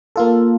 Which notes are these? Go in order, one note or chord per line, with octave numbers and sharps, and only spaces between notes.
A#3 F4 A4